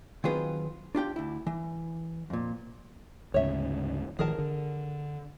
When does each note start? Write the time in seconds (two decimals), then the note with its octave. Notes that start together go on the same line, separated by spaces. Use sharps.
0.24 D#3 F#3 C4 F4 G#4 B4
0.95 D4 F4 G4 G5
1.16 D2 E4
1.47 E3
2.30 F2 A#2
3.34 D2 G#2 C#3 C#5 E5
4.19 A1 D#3 F3 G#4 A#4 A5
4.38 D3